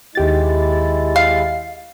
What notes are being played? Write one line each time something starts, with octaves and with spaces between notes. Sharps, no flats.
D#2 G#3 E4 G4 A6
F5